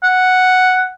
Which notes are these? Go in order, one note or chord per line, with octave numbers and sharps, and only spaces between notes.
F#5